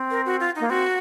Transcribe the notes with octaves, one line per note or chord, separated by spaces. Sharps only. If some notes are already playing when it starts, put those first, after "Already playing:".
Already playing: C4
A#4
F#4
F4
A#3 D#4
C4 F#4